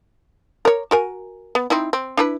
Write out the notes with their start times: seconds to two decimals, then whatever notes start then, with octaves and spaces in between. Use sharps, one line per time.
0.65 A#4 C#5
0.91 F#4 A#4 G#5
1.55 B3
1.70 C4 D#4 E4
1.93 C4
2.17 D4 E4 B4